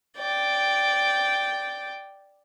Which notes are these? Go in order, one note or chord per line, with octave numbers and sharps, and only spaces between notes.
D5 G5